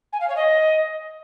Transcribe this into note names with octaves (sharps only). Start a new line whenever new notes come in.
G#5
F5
C#5
D#5